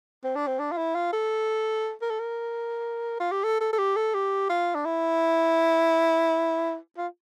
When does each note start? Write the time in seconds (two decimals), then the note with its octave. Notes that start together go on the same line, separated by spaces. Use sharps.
0.24 C4
0.35 D4
0.47 C4
0.59 D4
0.72 F4
0.78 E4
0.95 F4
1.13 A4
2.02 A#4
2.10 A4
2.20 A#4
3.20 F4
3.32 G4
3.43 A4
3.61 A4
3.73 A4
3.78 G4
3.96 A4
4.14 G4
4.50 F4
4.75 D4
4.85 E4
6.97 F4